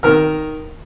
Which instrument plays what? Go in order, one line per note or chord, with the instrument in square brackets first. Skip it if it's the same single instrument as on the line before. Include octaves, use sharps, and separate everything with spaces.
[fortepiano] D#3 A#4 F6